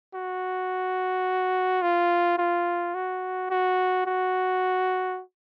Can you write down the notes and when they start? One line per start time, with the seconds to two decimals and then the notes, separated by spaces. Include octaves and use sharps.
0.14 F#4
1.82 F4
2.38 F4
2.95 F#4
3.50 F#4
4.06 F#4